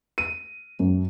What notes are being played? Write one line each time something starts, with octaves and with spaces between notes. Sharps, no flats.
D#7
F#2